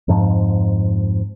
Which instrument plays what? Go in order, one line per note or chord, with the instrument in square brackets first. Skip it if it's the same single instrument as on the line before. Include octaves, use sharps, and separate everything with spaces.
[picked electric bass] F2 G#2 F3